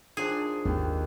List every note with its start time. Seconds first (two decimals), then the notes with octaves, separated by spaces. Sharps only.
0.17 D#3 F3 D4 G#4
0.65 G#1 D#2